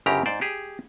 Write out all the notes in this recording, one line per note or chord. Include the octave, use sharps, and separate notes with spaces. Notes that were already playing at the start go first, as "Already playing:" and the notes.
G1 F#2 C#3 E4 G4 A#5
G#2 C5 D5
G4 G#4